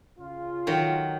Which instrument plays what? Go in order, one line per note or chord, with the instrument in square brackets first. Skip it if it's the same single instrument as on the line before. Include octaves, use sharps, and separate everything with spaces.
[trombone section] C#3 F4
[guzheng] D#3 F#3